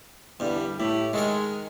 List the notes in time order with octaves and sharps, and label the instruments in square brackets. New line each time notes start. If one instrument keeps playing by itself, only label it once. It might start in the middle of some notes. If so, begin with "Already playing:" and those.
[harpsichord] E2 G2 [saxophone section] D3 G3
[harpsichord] A2 [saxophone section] A3 E4 G4
[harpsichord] D#3 A4 A#4 [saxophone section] G#3